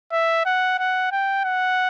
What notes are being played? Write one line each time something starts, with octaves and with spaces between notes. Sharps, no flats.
E5
F#5
F#5
G5
F#5